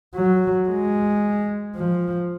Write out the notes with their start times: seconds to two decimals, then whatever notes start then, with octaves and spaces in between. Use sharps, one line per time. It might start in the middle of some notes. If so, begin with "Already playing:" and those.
0.15 F#3
0.69 G#3
1.76 F3